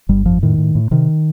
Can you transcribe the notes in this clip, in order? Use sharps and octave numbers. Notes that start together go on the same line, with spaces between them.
G1 G3
F2 F3
A2 D#3
A2
A2
C3 D#3